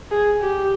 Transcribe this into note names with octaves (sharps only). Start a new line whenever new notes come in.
G#4
G4